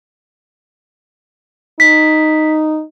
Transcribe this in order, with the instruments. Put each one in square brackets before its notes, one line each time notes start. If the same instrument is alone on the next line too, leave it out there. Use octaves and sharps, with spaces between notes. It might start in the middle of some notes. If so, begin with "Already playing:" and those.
[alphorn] D#4 [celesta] B6